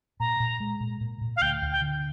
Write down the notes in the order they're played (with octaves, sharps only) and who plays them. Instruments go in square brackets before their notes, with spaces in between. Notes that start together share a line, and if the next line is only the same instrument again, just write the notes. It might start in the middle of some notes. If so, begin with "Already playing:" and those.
[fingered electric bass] A#2 [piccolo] A#5
[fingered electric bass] A#2
G#3
A#2
A#2
A#2
[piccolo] F5
[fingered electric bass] D2 [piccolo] G5
[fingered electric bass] D2
[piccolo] G5
[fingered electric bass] D3